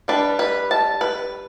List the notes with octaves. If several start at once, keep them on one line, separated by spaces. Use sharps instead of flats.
G3 D4 B4
B4
A5
B4